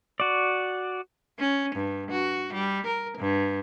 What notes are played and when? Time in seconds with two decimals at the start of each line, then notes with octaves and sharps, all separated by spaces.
0.20 F#4 D5
1.39 C#4
1.75 G2
2.11 F#4
2.53 G3
2.87 A#4
3.18 G2